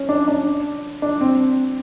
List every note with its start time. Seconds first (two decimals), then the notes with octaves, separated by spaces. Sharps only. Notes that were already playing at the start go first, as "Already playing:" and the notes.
Already playing: C#4
0.09 D4
0.28 D4
1.02 D4
1.21 C4